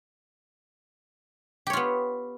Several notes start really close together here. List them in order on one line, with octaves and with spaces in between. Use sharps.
G4 C#5 F4 B3